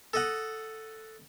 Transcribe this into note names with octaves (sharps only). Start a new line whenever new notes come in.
A4 D#5 F#5